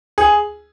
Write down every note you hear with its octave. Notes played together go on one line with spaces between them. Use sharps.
G#4